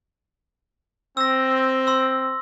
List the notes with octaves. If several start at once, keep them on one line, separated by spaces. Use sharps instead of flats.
C4 E6 A#6
C6 E6